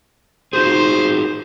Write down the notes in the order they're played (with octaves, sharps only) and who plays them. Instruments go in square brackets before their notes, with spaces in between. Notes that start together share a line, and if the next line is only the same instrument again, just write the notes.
[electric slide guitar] D#4 F#4 G#4 [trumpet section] C5